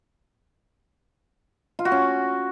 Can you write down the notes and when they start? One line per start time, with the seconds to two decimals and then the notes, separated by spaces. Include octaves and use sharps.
1.79 F4
1.85 F#4
1.92 C#4